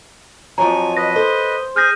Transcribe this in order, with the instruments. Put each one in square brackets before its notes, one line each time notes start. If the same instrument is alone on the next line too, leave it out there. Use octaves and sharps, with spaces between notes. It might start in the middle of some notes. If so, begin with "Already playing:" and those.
[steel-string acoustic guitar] F2 F3 F#3 [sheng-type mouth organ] G#5 [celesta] A#5
[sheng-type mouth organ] B4 D#5 [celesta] A#6
[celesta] A4 [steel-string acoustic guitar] C5
[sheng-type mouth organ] G#4 G#5 [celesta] F6 G6 A#6